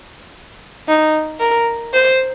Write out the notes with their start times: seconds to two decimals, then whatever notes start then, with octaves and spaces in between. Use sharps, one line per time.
0.88 D#4
1.40 A#4
1.93 C5